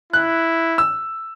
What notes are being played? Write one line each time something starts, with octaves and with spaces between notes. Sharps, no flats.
E4 F#6
E6